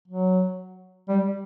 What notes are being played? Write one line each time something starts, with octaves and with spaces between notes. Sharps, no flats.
F#3
G3